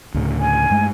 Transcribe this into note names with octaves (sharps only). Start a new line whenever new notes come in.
D2 A2 C#3
G#5
G2 G#3 A3